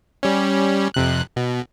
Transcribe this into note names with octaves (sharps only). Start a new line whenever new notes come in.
G3 C#4
F2 C3 F#6
B2